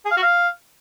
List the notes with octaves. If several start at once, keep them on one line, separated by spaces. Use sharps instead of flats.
G#4
F5
F#4
F5